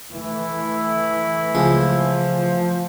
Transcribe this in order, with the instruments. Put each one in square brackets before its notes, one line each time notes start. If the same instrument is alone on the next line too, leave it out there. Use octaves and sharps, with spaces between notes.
[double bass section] E3 A3 [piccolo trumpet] E4
[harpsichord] C#2 G#3 C6 [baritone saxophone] F3